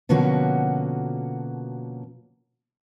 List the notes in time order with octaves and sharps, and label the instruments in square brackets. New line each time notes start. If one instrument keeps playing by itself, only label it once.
[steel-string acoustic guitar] B2 D3 F3 A#3 C#4 F#4